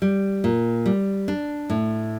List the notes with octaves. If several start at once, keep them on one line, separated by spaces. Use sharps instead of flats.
G3
A#2
G3
D4
A2